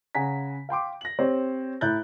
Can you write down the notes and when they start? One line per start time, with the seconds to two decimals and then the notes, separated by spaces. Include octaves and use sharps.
0.15 C#3 F#5 G#5 A#5 B6
0.69 F5 G5 C6 D6
1.01 A#6 F#7
1.19 C4 G4 C5 C#5
1.81 A2 E4 A#5 F#6 G6 A6